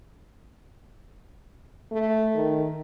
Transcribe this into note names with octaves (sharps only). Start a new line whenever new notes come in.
A3
D#3